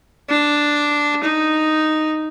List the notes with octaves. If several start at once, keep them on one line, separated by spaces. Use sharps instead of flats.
D4
D#4